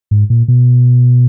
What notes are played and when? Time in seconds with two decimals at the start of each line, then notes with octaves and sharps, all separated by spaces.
0.11 G#2
0.30 A#2
0.48 B2